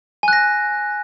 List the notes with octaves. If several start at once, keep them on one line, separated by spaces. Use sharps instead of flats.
G#5 F#6 A#6